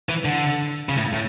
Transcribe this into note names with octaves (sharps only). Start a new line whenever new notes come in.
E3
D3
C#3
A2
A2